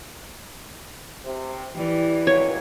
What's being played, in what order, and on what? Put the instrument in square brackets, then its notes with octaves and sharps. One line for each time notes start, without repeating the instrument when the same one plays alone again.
[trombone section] C3
[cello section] E3 [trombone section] G3
[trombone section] C#2 A#2 F#3 [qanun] C#5